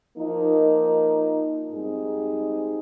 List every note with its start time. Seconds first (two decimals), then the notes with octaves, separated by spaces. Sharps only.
0.18 F3 A#3 D#4
1.71 G#2 G3 C4 D#4 G#4